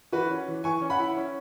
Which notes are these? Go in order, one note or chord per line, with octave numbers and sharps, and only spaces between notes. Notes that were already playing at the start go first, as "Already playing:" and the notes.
E3 F#4 B4
C#4
E3
E3 G#5 C#6
C#4
F#5 B5
E4
C#4